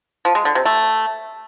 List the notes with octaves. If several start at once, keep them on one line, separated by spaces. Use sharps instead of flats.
F3
G#3
D3
C3
A3